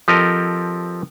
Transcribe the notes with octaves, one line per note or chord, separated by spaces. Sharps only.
F3 C4 G4 A4 A#4 D#5